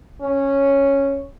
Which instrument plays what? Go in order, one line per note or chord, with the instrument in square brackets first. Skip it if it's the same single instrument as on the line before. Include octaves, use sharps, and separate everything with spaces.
[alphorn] C#4